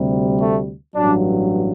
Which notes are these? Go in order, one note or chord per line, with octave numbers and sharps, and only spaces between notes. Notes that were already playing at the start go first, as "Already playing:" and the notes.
Already playing: D2 C3 G3
A3
A1 G2 F#3 D4